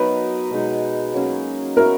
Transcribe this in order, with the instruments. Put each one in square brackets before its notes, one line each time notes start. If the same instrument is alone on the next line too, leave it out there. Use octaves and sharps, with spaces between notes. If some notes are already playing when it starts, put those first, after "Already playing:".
Already playing: [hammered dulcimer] F#3 B3 D#4 A#4 [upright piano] B4
[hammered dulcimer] B2 G#3 D#4
F#3 A#3 C#4 G#4
[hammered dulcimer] B3 F#4 C#5 E5 [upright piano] A#4